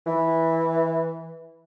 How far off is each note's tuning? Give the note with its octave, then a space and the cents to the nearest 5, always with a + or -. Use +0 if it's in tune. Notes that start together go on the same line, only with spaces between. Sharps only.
E3 -10